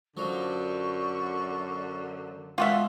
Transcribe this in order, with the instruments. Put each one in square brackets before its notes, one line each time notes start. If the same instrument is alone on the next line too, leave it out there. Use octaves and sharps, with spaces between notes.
[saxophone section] F#2 D3 [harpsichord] F3 F#3 [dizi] C#6
[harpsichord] B2 G#3 [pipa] F4 F#4 E5